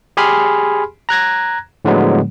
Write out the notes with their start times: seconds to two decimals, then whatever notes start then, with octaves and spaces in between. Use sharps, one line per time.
0.17 G4 G#4 G#5 B5 C6 F6
1.09 A#5 F#6 G#6 A#6
1.85 A2 D3 F3 F#3 G#3 B3